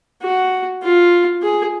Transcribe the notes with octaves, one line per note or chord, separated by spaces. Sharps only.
F#4
F4
G#4